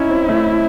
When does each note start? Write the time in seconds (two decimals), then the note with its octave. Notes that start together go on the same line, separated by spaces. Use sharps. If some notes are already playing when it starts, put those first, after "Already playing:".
Already playing: C#4 D#4 E4
0.10 C4
0.29 A3